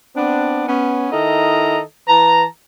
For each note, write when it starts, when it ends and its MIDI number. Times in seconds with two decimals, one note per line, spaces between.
0.16 0.67 59
0.16 0.67 60
0.16 0.67 62
0.67 1.07 59
0.67 1.07 61
1.12 1.81 51
1.12 1.81 64
1.12 1.81 69
1.12 1.81 75
1.12 1.81 82
2.08 2.45 52
2.08 2.45 71
2.08 2.45 81
2.08 2.45 82